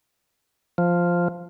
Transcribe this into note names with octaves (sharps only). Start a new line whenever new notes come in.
F3